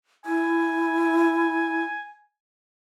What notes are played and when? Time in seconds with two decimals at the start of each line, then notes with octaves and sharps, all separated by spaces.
0.25 E4 G#5